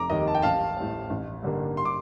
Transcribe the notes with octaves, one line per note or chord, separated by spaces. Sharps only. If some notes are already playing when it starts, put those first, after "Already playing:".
Already playing: F1 A#5 D6
D#2 D#3 G3 D#5
A5
G5
A1 F5 A5
A2 G3 C4
A1
G2 D3 G3 A#3
C6
D6